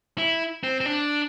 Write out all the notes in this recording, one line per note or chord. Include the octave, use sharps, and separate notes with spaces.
E4
C4
C4
D4